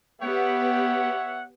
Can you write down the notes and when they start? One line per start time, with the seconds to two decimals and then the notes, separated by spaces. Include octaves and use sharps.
0.22 B3 G4 C#5 E5 F#5